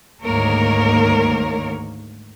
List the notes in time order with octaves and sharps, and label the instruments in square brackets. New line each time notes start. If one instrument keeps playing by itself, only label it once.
[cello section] D2 G#2 D#3 A#3 A#4 C#5